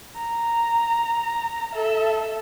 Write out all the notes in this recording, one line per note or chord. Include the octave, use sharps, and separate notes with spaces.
A#5
A4 E5